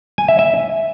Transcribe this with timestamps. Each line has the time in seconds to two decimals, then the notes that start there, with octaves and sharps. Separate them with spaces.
0.18 G#5
0.28 E5
0.39 E5